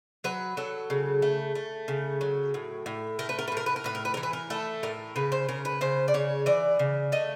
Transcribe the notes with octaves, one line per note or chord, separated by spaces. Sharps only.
F#3 B4
F#3 A4
C#3
A3
A3
C#3
F#3
A2
A2
A3 A#4
B4
A#4
B4
A2 A#4
B4
A#4
A2 B4
A#4
B4
E3 A#4
B4
A#4
A3 A4
A2 A#4
C#3 B4
C5
C#3 A#4
B4
C#3 C5
D5
C#3 C#5
E3 D5
C#3
A3 D#5